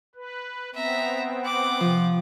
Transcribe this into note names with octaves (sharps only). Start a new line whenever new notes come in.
B4
B3 C4 E5 A#5
F#5 D6
C3 F3